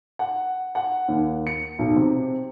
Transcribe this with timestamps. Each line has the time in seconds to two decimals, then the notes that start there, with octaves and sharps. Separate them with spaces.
0.19 F#5
0.75 F#5
1.08 D#2
1.47 C#7
1.79 B1
1.96 C3